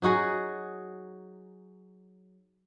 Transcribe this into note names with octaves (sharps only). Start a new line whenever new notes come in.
F#3 D#4 F#4 G#4